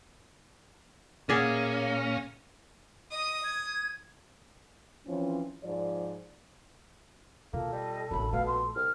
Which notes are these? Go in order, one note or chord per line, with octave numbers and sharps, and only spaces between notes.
A#2 A#3 C#4 G#4 D5 E5 F5 A#6
D#5 D#6
G#6
E3 F3 C4 C#4
G#2 F3 D5
B2 A#3 F4 A4
G3 D#5
A1 F#2 D4 B5
A#1 B2 A3 F5
C6
C2 F6